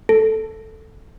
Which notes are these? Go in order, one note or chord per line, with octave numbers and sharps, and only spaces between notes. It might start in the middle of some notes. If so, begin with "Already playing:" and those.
A4